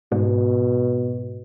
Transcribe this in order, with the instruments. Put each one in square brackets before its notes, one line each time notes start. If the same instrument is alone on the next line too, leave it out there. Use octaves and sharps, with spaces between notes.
[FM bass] G#2 [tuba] B2